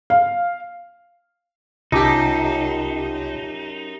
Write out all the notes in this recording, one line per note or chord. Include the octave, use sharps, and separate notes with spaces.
F5
C2 F#2 D#4 F4 G4 A5 D6